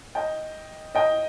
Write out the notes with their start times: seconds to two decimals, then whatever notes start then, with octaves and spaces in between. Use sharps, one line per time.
0.15 D#5 G5
0.95 D#5 G5